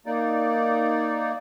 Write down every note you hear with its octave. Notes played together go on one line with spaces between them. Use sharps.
A#3 D#4 D5